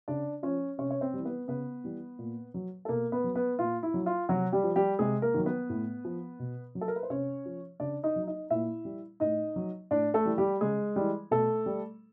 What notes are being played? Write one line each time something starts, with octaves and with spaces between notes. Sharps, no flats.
C#3 D4 D5
F3 C#4 C#5
C3 C#4 C#5
C#5
C4 C5
E3 G3
B3 B4
C#3 B3 B4
E3 G3
A#2
F#3
A4
B2 A#3 A#4
B3 B4
F#3
B3 B4
A#2 F4
E4
F#3
F4
C3 F#3 F#4
G3 G4
F3
G3 G4
C3 G#3 G#4
A#3 A#4
D#3 F#3
B3 B4
A2
F3
B2
F#3
A4
A#4
B4
C5
C3 C#4 C#5
F3
C#3 D4 D5
D#4 D#5
F#3
D#4 D#5
A#2 E4 E5
G3
A2 D#4 D#5
F#3
A2 D4 D5
A3 A4
E3 G3
G3 G4
C#3 G#3 G#4
E3 G3
B2 A3 A4
G3